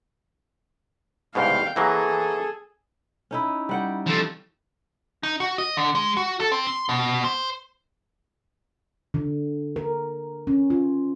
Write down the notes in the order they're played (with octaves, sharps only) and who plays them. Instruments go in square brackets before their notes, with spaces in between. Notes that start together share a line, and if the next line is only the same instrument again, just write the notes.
[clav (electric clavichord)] C2 G#2 B2 [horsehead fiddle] F5 G5
[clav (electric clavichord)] E3 F#3 A#3 [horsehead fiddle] G#4 A4
[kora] C#4 D#4 E4
G3 F#5 G5
[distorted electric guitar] F3 A3
[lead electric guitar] D#4
F#4
D#5
D3
G#3
F#4
A4
C4
C6
B2
C5
[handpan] D3
A#4
C#4
F4